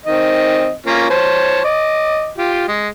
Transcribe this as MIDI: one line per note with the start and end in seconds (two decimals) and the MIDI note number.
0.06 0.73 51
0.06 0.73 60
0.06 0.73 75
0.86 1.08 58
0.86 1.08 61
0.86 1.08 65
1.10 1.63 72
1.10 1.63 73
1.10 1.63 81
1.64 2.30 75
1.64 2.30 86
2.38 2.67 65
2.38 2.67 67
2.68 2.88 56